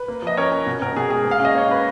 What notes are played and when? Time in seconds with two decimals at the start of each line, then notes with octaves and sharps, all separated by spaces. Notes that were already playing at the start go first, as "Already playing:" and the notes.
Already playing: B4
0.08 A#3
0.22 F3 D#5
0.37 C#4 A#4 C#5
0.51 C#4
0.66 B2
0.82 B2 A#4
0.96 B2 G#4
1.10 G#3 G#4
1.25 A#3
1.31 F5
1.40 C#4 D#5
1.55 A#3 C#5
1.69 C#4 B4